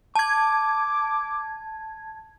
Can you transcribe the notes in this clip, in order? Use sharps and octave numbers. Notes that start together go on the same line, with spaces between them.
A5 D6 G#6